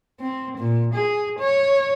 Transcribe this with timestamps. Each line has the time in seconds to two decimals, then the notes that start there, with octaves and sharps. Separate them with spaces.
0.20 C4
0.58 A#2
0.94 G#4
1.39 C#5